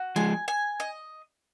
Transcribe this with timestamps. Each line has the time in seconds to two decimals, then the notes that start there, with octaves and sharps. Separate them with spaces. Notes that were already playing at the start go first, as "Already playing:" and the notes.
Already playing: F#4
0.16 F3 G#3 G#5
0.48 G#5
0.80 D#5